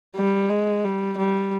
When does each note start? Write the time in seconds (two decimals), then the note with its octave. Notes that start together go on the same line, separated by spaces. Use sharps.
0.16 G3
0.49 G#3
0.84 G3
1.18 G3